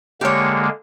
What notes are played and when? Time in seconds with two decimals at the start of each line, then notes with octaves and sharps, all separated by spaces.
0.21 D3 G#3 A#3 G4 C#5